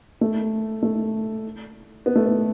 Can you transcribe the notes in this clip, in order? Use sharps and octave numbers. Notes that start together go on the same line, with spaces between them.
A3
A3
B3
A3
B3